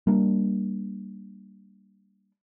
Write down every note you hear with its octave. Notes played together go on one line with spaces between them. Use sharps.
G3 A#3 D4